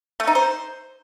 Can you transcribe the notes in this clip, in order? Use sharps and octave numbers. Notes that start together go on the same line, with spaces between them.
A3
D#4
C5